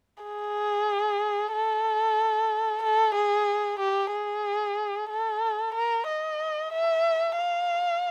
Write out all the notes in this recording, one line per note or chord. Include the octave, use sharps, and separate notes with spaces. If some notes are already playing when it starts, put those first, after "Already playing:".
G#4
A4
A4
G#4
G4
G#4
A4
A#4
D#5
E5
F5